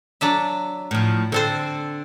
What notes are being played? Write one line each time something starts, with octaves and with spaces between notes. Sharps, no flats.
F#3 D4 E5
A2 F3
D3 C4 A4 C5